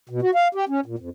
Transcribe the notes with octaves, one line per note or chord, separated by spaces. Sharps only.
B2
F#4
F5
G4
C#4
A#2
F2